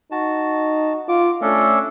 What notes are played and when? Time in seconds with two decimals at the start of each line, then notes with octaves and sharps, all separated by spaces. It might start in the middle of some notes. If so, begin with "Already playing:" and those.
0.12 D#4 F#4 A5
1.09 F4 D6
1.41 A3 C#4 D4 A4